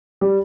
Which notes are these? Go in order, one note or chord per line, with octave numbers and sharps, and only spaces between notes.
G3 G4